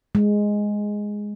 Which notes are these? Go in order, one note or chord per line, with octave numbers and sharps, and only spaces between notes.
G#3